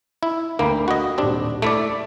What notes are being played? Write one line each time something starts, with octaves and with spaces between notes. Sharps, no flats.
E4
D2 A#3 G5 B5
F#4 D#5
D#1 C4 D4 G4
A3 E4 D5 B6 D7